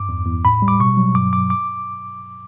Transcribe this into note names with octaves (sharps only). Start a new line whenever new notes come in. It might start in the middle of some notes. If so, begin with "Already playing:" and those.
Already playing: G2 D6
E2
E2
A2 B5
G3
D6
B2 C#6
F#3
G2 D6
G2 D6
D6